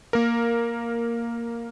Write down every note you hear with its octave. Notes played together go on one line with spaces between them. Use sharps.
A#3 A#4